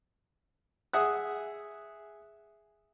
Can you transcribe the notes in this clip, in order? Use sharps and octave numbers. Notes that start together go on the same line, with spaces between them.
G#4 E5 F#5 D#6 F#6